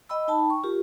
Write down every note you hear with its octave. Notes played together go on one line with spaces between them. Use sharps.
D#5 G5 B5 E6
D#4 G5 A5 B5
C#6
F4 G4 A#4